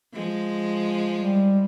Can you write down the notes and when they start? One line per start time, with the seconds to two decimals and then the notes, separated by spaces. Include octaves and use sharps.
0.13 F3 G#3
1.17 G3